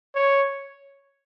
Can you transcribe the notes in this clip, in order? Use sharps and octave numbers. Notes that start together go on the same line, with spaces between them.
C#5